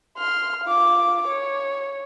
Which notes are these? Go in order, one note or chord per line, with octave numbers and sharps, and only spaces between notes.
C6 F6
F4 D6
C#5